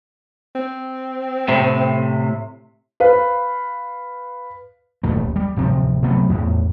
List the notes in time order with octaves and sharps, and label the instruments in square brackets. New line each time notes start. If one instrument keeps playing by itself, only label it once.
[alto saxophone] C4
[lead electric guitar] A2 C3
[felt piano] B4 F5
[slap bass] D#1 A1 D#2 A3
G3
D1 C3 F3 C4
C3 F#3 A3 B3
E2 A2